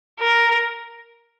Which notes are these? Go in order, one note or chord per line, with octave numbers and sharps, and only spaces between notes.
A#4